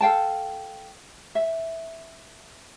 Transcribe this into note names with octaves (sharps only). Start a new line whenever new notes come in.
A4 F5 G5 A5
E5